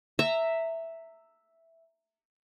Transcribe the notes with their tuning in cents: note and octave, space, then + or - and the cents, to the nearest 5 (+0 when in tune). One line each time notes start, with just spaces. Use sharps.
E5 +0 A#5 -25